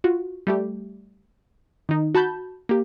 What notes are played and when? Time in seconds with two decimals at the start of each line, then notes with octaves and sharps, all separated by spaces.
0.04 F4 F#4
0.47 G3 A3 G4
1.89 D#3 D#4
2.15 F#4 A5 B5 G6
2.69 A#3 G4